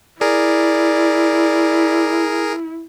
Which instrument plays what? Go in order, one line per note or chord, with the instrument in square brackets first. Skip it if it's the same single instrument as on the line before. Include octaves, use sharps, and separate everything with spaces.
[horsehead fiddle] E4 [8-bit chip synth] G#4 A#4 [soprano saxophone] D5